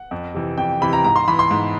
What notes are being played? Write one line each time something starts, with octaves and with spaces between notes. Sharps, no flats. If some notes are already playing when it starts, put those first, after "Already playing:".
Already playing: F#5
F2
C3 E3
F2 G5
C3 E3 B5
A#5
G#2 A#5
C6
E3 B5
C6
G#2